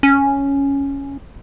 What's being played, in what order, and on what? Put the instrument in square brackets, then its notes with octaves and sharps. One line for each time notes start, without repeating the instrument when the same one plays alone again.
[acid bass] C#4